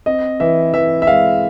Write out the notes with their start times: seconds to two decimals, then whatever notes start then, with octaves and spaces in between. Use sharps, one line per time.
0.06 C4 D#5
0.40 E3 E5
0.74 E3 E5
1.02 E5
1.07 G#3 F5